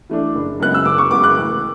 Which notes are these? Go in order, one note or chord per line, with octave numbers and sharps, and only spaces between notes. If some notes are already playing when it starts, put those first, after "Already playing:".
E3 A3 D4
F#1
F#2 C#3 G#3 B3 F#6
E6
F#1 D6
C#6
F#2 C#3 G#3 B3 D6
F#6
A1